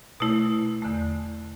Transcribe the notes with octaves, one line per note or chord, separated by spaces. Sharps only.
B2 A3 E4
E2 D3 A3